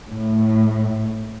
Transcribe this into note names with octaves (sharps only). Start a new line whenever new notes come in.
A2